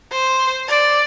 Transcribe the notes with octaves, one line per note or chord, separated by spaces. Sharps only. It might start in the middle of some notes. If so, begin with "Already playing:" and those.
C5
D5